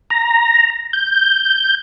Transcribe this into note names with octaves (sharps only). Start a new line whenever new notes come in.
A#5
G6